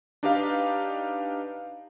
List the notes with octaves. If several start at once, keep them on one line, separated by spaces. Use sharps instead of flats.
D4 D#4 G4 B4 F5